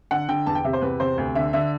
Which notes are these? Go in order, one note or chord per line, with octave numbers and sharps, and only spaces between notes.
D3 F#5
D3 G5
E2 A5
G5
C3 E5
C5
E2 B4
C3 C5
D2
D3 E5
D3 E5